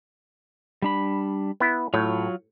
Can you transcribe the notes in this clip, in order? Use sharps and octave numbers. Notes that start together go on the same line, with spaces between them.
G3 D4 B5
B3 E4
A2 F#3 F4 C#5